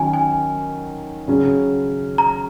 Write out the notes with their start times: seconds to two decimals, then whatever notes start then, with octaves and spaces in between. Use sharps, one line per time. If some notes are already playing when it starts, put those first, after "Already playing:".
Already playing: D#3 F#3 C#4 G#5
0.13 G#5
1.28 C#3 F#3 C#4
2.18 A#5